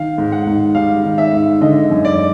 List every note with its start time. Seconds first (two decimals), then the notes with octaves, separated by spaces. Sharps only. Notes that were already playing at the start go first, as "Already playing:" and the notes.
Already playing: D#3 F5
0.18 G#2
0.32 F#5
0.47 G#2
0.75 G3 F5
1.04 D#3
1.18 E5
1.32 G#2
1.61 D3 D#5
1.90 F#2
2.05 D5